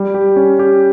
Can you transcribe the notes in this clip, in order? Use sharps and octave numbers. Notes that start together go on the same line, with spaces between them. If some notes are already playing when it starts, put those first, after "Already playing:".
Already playing: G3
G4
C#4
G4